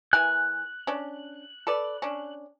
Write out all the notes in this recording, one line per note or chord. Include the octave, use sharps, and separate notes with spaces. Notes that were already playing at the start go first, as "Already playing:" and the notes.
E3 A#4 G#5 F#6
C#4 D4
A4 B4 D5
C#4 D4